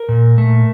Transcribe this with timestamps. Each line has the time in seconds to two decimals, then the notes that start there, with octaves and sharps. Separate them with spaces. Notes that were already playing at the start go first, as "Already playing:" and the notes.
Already playing: A#4
0.09 A#2
0.38 A3